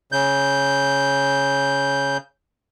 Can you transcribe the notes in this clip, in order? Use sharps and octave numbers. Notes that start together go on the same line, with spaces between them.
C#3 G6